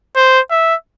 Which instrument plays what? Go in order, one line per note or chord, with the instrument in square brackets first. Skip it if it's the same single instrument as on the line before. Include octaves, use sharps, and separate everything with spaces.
[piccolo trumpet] C5
E5